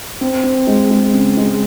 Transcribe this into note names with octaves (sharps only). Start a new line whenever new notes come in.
C4
C4
G#3
G#3
C#3
G#3